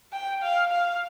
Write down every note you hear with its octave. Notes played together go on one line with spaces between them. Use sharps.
G5
F5
F5